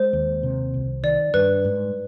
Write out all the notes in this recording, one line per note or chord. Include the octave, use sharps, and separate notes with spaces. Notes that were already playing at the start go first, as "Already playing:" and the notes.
Already playing: G#3 C5
D#2
C3
C2
D#3 D5
G2 B4
G#2